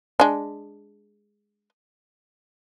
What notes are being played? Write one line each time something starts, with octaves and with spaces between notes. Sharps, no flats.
G#3 D4